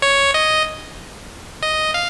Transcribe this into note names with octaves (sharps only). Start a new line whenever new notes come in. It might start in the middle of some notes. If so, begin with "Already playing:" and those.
C#5
D#5
D#5
F5